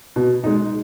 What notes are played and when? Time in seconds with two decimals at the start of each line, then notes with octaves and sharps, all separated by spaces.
0.16 B2
0.44 G#3 D#4